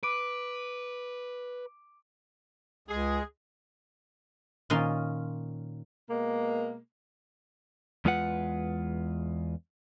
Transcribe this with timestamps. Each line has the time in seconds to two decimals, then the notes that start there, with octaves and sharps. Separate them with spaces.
0.03 B4 D6 D7
2.88 C#2 G#3 G#4
4.70 A#2 D#3 C#4 D#4 F4 C6
6.10 B2 G#3 A#3
8.05 E2 G#3 F4 B4 F#5